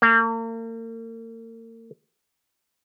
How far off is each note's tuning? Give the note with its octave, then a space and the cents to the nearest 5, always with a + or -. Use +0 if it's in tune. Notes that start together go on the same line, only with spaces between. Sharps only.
A#3 -40